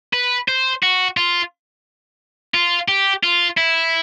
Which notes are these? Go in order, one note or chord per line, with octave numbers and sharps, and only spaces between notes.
B4
C5
F#4
F4
F4
G4
F4
E4